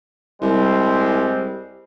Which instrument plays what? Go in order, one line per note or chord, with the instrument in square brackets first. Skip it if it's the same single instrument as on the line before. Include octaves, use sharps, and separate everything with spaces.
[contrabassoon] C2 [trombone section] G3 G#3 C4